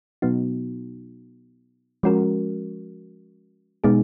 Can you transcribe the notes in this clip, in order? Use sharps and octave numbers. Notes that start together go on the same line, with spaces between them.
B2 F#3 B3 D#4 F#4
F3 G#3 C#4 F#4 A#4
B2 G#3 B3 D#4 G#4